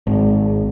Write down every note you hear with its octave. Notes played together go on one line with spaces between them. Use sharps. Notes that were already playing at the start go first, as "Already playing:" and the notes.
G#1